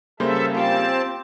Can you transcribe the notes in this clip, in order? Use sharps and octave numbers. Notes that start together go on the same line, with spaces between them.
C#3 G3 A#3 A4 C5 E5
C4 F4 G4 F5 A5